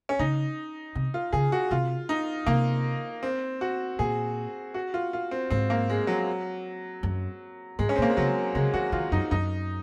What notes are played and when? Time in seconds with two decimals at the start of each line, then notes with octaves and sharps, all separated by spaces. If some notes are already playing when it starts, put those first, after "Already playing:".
0.09 C#4
0.19 C#3 D#4
0.95 C3
1.14 F4
1.33 C#3 G#4
1.52 F#4
1.71 C3 F4
2.09 D#4
2.46 C3 A#3
3.23 C4
3.61 F#4
3.99 A#2 G#4
4.74 F#4
4.94 F4
5.13 F4
5.31 C4
5.50 G#2 C4
5.70 A#3
5.89 G#3
6.07 F#3
7.03 F#2
7.79 G#2 G#3
7.89 C#4
7.96 A#2 C4
8.02 A#3
8.10 G#3
8.17 C#3 F#3
8.55 C#3 G#3
8.74 D#3 F#4
8.92 D#3 F4
9.12 F#2 D#4
9.31 F#2 D#4